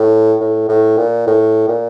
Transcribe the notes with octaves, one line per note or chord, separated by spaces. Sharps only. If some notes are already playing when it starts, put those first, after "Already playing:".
Already playing: A2
A2
A2
A#2
A2
A#2